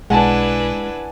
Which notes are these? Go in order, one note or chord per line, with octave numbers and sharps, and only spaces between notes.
B1 G#3 D4 E4 B4 F#5 G#5 A5